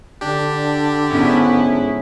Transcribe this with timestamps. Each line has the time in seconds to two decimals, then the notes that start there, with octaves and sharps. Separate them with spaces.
0.21 D3 D4 G4
1.10 G#2 B3 C#4 E4